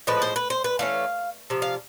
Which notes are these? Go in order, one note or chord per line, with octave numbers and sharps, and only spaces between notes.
A2 F3 G#3 B4
C5
B4
C5
B4
E3 A3 C#4 F5
C3 F3
F5